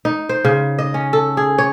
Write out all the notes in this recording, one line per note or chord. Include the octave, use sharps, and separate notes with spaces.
D#4
C5
C#3
D#5
C#4
A4
G#4
C#5